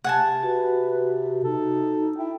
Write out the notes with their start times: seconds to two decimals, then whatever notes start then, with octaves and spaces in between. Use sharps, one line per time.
0.04 C3 F#5 G#5 A5
0.43 F#4 B4
1.44 D#4 A4
2.17 E4 G5